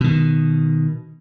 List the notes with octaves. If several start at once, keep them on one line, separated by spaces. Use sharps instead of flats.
B2 D#3